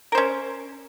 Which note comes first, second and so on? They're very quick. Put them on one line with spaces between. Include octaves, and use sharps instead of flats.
A#4 C5 C#4